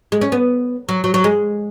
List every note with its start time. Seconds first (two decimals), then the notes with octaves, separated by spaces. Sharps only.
0.12 G#3
0.21 C#4
0.32 B3
0.89 F#3
1.04 F#3
1.14 F#3
1.24 G#3